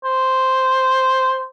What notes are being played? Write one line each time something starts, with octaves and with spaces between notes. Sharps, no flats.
C5